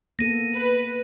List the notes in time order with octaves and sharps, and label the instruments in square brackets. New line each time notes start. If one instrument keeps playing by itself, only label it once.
[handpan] A#3 B3 A4 [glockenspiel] A#6 D#7
[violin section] B4